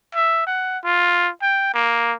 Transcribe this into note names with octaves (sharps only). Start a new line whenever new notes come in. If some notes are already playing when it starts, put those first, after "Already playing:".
E5
F#5
F4
G5
A#3